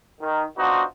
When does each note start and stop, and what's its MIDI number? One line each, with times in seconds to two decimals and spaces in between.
0.21 0.43 51
0.57 0.82 59
0.57 0.82 62
0.57 0.82 63
0.57 0.82 65
0.57 0.82 66
0.57 0.82 72